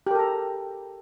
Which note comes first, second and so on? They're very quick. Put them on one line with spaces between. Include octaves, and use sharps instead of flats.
G4 A#4 A4 A#5